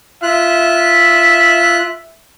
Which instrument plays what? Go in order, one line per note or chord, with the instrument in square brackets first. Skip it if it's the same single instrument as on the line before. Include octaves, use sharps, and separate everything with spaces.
[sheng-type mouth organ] F4 F#6 [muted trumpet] E5